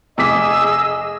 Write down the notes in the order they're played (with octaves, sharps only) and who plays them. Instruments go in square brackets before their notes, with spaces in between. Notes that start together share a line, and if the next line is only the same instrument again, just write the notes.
[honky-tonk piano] F1 D6 B6 [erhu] G#4 [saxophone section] D#5 [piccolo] E6